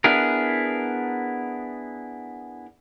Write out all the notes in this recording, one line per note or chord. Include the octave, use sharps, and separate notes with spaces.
B3 D4 E4 G#4 A#4